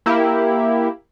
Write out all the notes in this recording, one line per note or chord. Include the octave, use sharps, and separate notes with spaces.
A#3 E4 G4